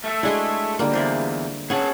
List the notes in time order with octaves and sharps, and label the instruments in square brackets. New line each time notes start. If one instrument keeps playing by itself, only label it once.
[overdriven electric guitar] A3 A4
[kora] G#3 D4 E4 [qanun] F#4 G#4 C6
[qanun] D3 G3 A#3 [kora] F4
[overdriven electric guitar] E2 [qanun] C5 D5 E5
[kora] B3 F#5 [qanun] C#4 C#5 [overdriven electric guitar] G#4 A5